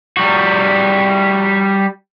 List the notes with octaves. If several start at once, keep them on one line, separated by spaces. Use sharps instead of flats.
G3 F#4